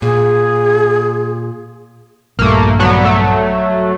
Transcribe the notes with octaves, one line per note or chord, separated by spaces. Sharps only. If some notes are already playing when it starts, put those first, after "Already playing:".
A#2 G#4
A#1 G2 A3 A#3
D3 F#3 B3
F#3 A3